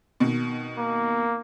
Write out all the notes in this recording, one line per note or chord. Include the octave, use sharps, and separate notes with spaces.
B2 D#3
A#3